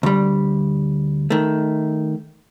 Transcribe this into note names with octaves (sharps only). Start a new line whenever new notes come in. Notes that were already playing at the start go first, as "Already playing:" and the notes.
D2 G3
D#3 A3